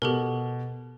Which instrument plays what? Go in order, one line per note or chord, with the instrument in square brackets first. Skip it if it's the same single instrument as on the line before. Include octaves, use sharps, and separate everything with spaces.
[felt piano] B2 [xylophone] G4 A4 A#4